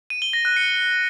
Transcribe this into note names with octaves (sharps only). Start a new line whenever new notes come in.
D#7
G7
A#6
F#6
C#7